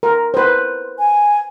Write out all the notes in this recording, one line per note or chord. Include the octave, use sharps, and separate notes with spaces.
A#4
B4 C5
G#5